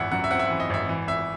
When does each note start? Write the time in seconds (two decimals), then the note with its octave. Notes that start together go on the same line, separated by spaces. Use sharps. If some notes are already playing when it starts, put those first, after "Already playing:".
Already playing: G#1 E3 E5 F#5
0.11 F#2 F#5
0.24 E5
0.31 C4 F#5
0.39 E5
0.45 E3 F#5
0.60 D#5
0.70 G#1 E5
0.89 E3
1.07 G#1 E5